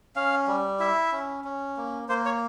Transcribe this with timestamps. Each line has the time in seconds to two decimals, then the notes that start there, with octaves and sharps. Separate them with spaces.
0.16 C#4 F5
0.47 G3
0.80 E4 E5
1.12 C#4
1.44 C#4
1.77 A#3
2.09 A#3 C5
2.25 C#5